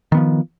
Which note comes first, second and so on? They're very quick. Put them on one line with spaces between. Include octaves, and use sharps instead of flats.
D#3 B3 F3